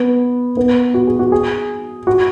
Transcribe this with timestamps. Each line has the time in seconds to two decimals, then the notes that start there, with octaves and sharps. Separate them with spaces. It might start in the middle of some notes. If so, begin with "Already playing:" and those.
Already playing: B3
0.57 B3
0.94 F#4
1.07 G#4
1.19 F#4
1.32 G#4
2.07 F#4